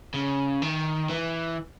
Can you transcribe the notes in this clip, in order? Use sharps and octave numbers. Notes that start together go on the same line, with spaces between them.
C#3
D#3
E3